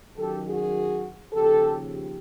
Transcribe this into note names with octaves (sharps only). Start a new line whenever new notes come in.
F#2 D#3 F#3 G4 A4
F#4 G#4
D#2 C#3 F3 G4 A4
G4